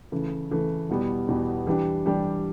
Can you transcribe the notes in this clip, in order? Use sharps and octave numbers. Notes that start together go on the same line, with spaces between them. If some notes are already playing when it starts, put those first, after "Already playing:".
C#3 E3 A3
C#3 E3 A3
E2 B2 G3 B3
E2 B2 G3 B3
E3 G3 D4 G4
E3 G3 D4 G4